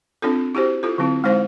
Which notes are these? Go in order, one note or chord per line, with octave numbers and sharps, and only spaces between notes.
C4 D4 F4 A4
E4 F#4 G4 C5
E4 F4 A4
D3 F#3 C4 E4
G#3 D#4 E4 C5 F5